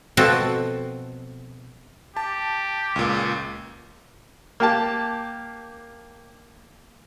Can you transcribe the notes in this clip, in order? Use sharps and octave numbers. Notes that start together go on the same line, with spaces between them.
B2 F3 C4 F#4 A4
G4 A5
C#2 A#2
A#3 G4 A5